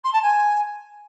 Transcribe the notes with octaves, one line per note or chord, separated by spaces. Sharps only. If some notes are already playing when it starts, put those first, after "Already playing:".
C6
A5
G#5